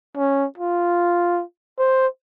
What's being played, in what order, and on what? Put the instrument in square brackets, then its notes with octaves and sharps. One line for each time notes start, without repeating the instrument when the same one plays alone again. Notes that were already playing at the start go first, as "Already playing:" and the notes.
[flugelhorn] C#4
F4
C5